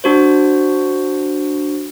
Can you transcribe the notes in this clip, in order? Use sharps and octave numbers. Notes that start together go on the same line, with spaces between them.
D4 F#4 C5